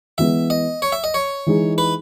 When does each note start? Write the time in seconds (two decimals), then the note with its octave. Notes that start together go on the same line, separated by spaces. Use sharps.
0.18 E3 G#3 B3 E5
0.50 D#5
0.82 C#5
0.92 E5
1.04 D#5
1.14 C#5
1.46 E3 G#3 D#4 G#4
1.78 B4